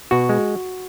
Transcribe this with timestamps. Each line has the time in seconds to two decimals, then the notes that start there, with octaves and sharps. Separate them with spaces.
0.11 B2 F#4
0.29 G#3